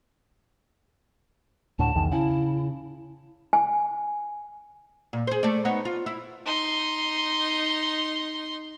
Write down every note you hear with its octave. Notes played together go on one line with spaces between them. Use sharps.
D2 A2 D3 A5
B1 E2 D#3
C#3 E4
G#5
A#2
G#4 C5
A3 D5
B3 D#4 C#5
F4
E4
D#4 C6